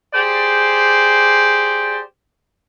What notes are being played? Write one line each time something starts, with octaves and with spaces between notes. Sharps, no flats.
G4 G#4 C5 D5